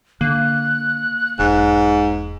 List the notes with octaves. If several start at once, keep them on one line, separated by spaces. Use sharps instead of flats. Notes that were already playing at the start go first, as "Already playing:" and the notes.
D3 A#3 F#6
E1 G#2